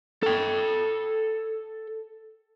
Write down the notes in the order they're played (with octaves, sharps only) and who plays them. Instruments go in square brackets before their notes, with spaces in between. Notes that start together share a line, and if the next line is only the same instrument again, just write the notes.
[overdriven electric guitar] A4 G5